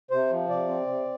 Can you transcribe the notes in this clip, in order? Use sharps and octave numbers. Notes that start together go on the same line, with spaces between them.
C3 C5
F3
C3 D5
C4
C3